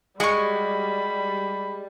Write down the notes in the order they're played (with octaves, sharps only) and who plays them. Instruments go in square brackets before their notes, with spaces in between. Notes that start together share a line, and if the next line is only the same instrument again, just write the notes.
[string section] G3 [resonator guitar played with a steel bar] G#3 [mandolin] F#4 C#6 [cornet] B5